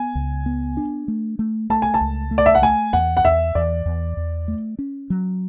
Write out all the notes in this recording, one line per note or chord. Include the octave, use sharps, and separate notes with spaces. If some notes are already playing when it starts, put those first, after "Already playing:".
Already playing: B3 G#5
C#2
B3
D4
A3
A3
A3 A5
G#5
A5
C#2
A3
D5
E5
F#5
A3 G#5
E2 F#5
F#5
E2 E5
E2 D5
E2
E2
A3
C#4
F#3